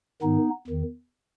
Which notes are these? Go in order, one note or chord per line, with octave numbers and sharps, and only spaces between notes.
G#2 D#3 B3 D#4
E2 D#3